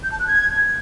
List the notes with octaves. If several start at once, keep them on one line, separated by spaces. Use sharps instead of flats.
G6
A5
F#6
G#6